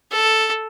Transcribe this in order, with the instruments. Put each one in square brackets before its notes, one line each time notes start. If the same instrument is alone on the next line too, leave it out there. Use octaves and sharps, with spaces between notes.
[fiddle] A4